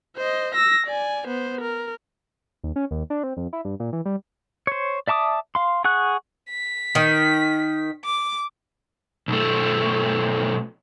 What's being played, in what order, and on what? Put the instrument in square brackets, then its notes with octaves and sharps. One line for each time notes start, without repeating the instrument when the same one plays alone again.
[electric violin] C5 D#5
E6 A#6
D5 G#5
B3 C5
A#4
[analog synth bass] D#2
C#4
D#2
D4
C4
F2
E4
G2
A#2
E3
G3
[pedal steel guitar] C5 C#5
D5 E5 A5 D6 D#6
F5 C6
G#4 F#5 C#6 F#6
[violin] B6
[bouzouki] D#3
[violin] D6
[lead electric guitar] B1 A3